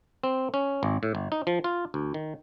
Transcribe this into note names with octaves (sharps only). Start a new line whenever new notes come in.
C4
C#4
G#1
A2
G1
D#4
F3
F4
D2
D#3